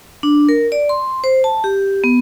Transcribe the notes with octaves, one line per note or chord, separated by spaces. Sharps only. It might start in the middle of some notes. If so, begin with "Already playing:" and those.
D4
A#4
D5
C6
C5
A5
G4
B3